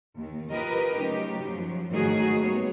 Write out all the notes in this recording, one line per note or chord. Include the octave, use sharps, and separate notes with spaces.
D#2 D#3
F4 G4 A#4 B4 D#5
C#3 F#3 A3 D#4 G4
F#2 F3 F#3
G#2 D#3 F#3 A3 F#4 G#4
G3 A#3 B3 C#5